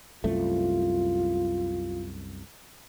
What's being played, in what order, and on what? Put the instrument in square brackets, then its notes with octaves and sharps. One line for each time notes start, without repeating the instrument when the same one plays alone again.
[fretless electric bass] C2 F#2 A3 [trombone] F4